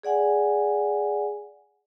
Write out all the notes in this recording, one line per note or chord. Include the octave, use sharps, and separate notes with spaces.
G#4 D5 F#5 G#5